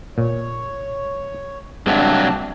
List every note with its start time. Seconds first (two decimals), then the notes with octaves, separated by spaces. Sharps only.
0.18 A#2 C#5
1.87 G2 C3 F#3 G#3 D4 A5